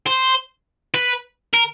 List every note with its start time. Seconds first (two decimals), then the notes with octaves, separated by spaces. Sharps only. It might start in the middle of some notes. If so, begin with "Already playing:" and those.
0.06 C5
0.94 B4
1.54 A#4